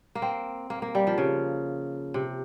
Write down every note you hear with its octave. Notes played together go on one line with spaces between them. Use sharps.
A#3
C4
A#3
A#3
G3
F3
C#3
C3